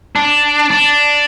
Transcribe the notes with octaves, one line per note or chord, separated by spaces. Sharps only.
D4
D4